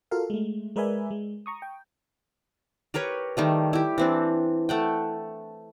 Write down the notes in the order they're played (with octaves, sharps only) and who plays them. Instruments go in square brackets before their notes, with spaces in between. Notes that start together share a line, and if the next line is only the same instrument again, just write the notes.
[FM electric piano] F4 F#4 A4 A#4 F5
G#3 A3
G#3 A#4 B4 D5 E5 G#5
G#3
A#5 C#6 D#6
G5
[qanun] G4 A#4 B4 C#5
D#3 G3 A3
E4 G4
E3 C4 D4
A3 F#5 G5